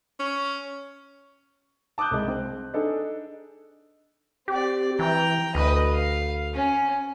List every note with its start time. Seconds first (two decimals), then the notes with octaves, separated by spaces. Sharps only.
0.20 C#4
1.98 A5 D6 D#6 F#6 G6
2.11 C2 G#3
2.28 C4
2.74 D4 D#4 G#4 A4
4.48 C4 G4 D5
4.99 E3 G5 A#5
5.55 D2 B4 D#5
5.94 F5
6.54 C#4